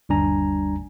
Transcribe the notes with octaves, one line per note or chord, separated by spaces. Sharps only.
G1 D#2 G3 D4 G#5 A#5